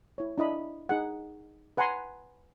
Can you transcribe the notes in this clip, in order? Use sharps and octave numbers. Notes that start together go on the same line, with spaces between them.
E4 C#5
D4 E4 D#5 B5
D#4 G#4 F#5
B4 F#5 G#5 A#5 C6